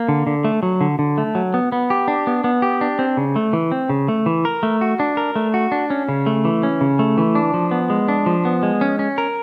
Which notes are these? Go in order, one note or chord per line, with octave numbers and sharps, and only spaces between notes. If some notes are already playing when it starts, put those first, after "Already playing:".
Already playing: A#3
D3
D3
A3
F#3
D3
D3
A3
F#3
B3
B3
G4
D4
B3
B3
G4
D4
C4
C#3
A3
E3
C4
C#3
A3
E3
A#4
A3
F#4
D4
A#4
A3
F#4
D4
C#4
C#3
A3
E3
C#4
C#3
A3
E3
D4
F3
B3
G#3
D4
F3
B3
G#3
C#4
C#4
A#4